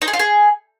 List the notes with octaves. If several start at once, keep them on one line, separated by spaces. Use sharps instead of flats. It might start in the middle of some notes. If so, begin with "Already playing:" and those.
D#4
G#4
F4
G#4